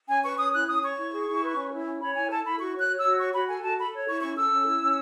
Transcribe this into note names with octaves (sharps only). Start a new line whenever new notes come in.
C#4 G#5
B4 C#6
C#4 D#6
E4 F#6
C#4 D#6
C#5 C#6
E4
G#4
E4
B4
C#4
E4
C#4
C#5 B5
E4 G#5
A4 A5
E4 B5
F#4 C#6
C#5 F#6
C#5
F#4 E6
C#5 C#6
F#4 B5
A4 G#5
F#4 A5
A4 B5
C#5
E4 C#6
C#4 C#6
A4 E6
C#4
E4
C#4